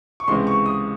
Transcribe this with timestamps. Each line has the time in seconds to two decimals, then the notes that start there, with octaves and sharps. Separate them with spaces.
0.20 C#6
0.28 C#2 C3 E3 G#3 C4 C6
0.47 C#6
0.66 D#6